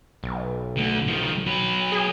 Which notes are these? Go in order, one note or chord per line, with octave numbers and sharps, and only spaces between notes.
B1
D2 D3
D#3 F3
F#3 B4
G#4